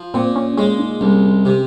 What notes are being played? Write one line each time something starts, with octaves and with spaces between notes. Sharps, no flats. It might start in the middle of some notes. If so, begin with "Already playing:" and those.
Already playing: F3
A#2 C4
C#4
G#3 C#4
D#4
C2 C#4
C3